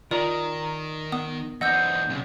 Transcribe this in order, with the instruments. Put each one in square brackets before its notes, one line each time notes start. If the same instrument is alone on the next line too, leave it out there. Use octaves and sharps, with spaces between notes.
[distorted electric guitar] D#3 [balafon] F4 [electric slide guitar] A#4 A#5 [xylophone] D5
[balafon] B3 [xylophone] D#6
[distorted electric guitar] E2 D#4 [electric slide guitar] C5 D#5 [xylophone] F#5 E6 G6
[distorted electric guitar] B1 [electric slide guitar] C#3 C4